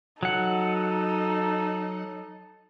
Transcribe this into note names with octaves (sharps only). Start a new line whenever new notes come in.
F#3 D#4 A4 F#5